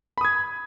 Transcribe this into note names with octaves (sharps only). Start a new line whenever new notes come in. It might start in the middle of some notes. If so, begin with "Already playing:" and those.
B5 D#6 G#6